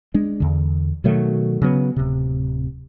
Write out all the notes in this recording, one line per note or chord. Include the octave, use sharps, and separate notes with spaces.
G#3 D4
E2 D3
B2 D#3 F#3 A3
C#3 F#3 B3
D1 C3